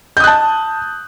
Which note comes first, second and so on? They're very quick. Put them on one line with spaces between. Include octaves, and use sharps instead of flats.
G6 D#6 F#6 A5